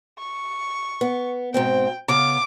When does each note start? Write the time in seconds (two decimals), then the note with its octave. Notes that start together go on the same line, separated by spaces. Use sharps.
0.18 C#6
1.01 B3
1.54 G#2 B2 C4 G5
2.08 C#3 B3 F5 D6